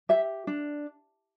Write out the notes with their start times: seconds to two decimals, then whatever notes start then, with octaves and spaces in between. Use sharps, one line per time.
0.09 G4 E5
0.47 D4